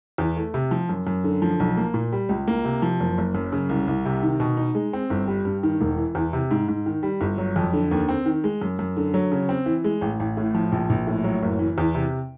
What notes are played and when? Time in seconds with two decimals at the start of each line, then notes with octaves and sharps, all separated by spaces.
0.18 E2
0.37 A3
0.54 C3
0.71 F3
0.89 F#2
1.07 F#2
1.24 D3
1.42 F3
1.60 B1
1.77 A#3
1.94 A#2
2.12 G3
2.29 C#2
2.48 A#3
2.65 C3
2.82 F3
3.00 F#1
3.18 F#1
3.35 F#2
3.53 C#3
3.69 C2
3.88 C2
4.05 C3
4.23 D#3
4.40 B2
4.57 D#4
4.75 G#3
4.93 C4
5.10 G1
5.28 G3
5.45 G2
5.63 D#3
5.81 E1
5.97 E3
6.15 E2
6.33 C3
6.51 G#2
6.68 G#2
6.86 D#3
7.03 G3
7.21 G1
7.38 F#3
7.56 F2
7.73 D3
7.91 D#2
8.09 C4
8.26 D#3
8.44 G#3
8.61 F#2
8.79 F#2
8.97 D3
9.14 F#3
9.32 C#3
9.49 C4
9.66 E3
9.84 G#3
10.01 A1
10.20 A1
10.37 A2
10.55 F3
10.72 A#1
10.90 A#1
11.07 A2
11.24 F#3
11.42 F#1
11.59 E3
11.78 E2
11.95 C3